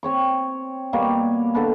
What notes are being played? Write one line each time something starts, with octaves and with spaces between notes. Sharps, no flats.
C4 C#5 C#6
B2 G3 A#3 C#5
D3 D4 A4 B4